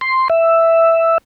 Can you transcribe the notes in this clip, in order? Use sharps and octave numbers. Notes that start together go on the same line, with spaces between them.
C6
E5